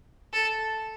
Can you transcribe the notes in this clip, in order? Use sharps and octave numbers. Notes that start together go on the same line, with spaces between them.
A4